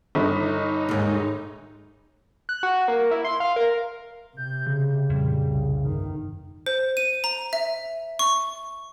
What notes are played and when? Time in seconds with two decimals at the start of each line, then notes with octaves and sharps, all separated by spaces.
0.15 G1 D#4
0.89 D#2 G#2
2.49 F#6
2.63 F#4
2.88 A#3
3.11 E4
3.25 C6
3.40 F5
3.56 A#4
4.37 C3 G6
4.67 C#3
5.10 F2 A#2 G3
5.48 C2
5.82 G1 D#3
6.66 C5
6.97 D#7
7.24 A#5
7.53 E5
8.19 C#6